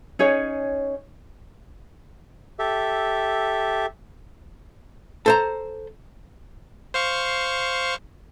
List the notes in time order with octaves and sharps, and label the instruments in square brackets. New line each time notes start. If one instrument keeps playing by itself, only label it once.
[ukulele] C#4 D#4 G#4 C#5
[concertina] G4 A4 E5
[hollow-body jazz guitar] A4 C5 A#5
[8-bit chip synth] C5 F5 C#6